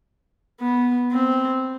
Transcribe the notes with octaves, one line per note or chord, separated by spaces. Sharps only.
B3
C4